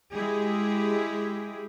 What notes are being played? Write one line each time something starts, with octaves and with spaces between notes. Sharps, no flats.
G#3 E4 G4 G#4